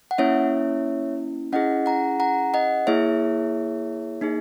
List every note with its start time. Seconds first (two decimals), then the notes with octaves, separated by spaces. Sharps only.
0.11 F#5
0.18 A#3 C#4 E4 C#5 E5
1.52 C#4 E4 G#4 D#5 F#5
1.86 F#5 A#5
2.20 F#5 A#5
2.54 D#5 F#5
2.87 A#3 E4 G#4 C#5 E5
4.21 A#3 D#4 G#4